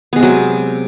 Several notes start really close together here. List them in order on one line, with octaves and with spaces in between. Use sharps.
B3 G#3 C3 F#3